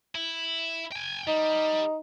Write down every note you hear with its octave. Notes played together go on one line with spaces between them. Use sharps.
E4
G5 G#5
G3 D#4